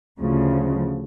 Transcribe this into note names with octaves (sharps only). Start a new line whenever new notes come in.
D2 C#3 F3